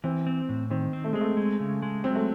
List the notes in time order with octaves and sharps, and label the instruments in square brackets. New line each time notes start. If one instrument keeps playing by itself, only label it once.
[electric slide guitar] E3 [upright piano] C4
[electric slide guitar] C4
A2
[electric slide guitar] D#3 [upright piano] C4
[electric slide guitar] C4
[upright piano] A3
[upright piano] G#3 [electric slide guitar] C4
[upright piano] A3
[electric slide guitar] G#3
C#3
G#3
[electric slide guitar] F#3 [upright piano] C4
[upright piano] A3